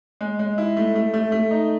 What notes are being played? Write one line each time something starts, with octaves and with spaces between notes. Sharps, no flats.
G#3
G#3
E4
A3
A3
A3
A3
D#4